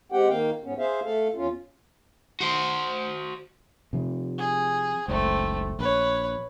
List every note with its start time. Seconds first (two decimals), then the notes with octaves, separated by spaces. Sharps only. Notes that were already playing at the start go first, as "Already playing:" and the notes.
0.12 G#3 C4 G4 F#5 G5
0.29 D#3 A#3 F5 G5
0.64 G#2 B3 C#4
0.78 G#4 C5 E5 F5
1.04 A3 A4 F5
1.35 E2 C#4 F4
2.41 F#4 C5
3.93 C3 F3
4.38 G#4
5.08 F#1 C#2 A3 C4
5.79 A#1 B4 C#5